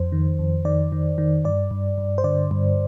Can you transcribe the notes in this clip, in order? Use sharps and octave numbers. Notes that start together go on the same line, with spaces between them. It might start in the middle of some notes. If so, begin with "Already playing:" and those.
Already playing: F2 C5
D#3
F2
D#3 D5
D#3
D#3
G2 D5
G2
G2
C5
D3 D5
G2